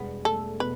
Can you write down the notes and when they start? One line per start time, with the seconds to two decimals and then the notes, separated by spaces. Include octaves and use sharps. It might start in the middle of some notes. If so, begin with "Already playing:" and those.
Already playing: E1 G3 B3
0.25 A3 A4
0.60 B2 B4